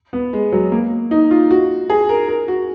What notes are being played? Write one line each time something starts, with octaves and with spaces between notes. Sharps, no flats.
B3
G#3
F#3
A#3
D#4
F4
F#4
G#4
A#4
A#4
F#4